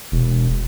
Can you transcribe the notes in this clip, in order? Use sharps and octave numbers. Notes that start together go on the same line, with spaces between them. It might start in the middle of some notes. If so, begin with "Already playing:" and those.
E1